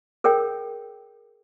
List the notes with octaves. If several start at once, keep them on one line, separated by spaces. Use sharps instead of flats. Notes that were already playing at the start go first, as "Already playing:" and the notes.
G#4 A#4 C#5 G5